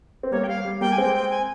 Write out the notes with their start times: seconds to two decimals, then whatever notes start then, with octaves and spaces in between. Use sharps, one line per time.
0.23 C4
0.31 G3 A#3 C#5
0.44 G5
0.48 G3 F5
0.65 G3
0.81 G3 A#3 G5
0.92 G#5
0.97 G#3 C4 G5
1.14 G5
1.30 G#5